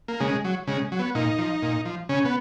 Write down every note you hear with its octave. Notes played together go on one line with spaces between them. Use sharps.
A#3
C#3 G#3
F#3
C#3 G#3
F#3
B3
A#2 D#4
F3
A#2
F3
C#3 C#4
B3